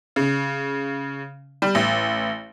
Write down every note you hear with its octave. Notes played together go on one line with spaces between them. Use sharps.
C#3
G3
A1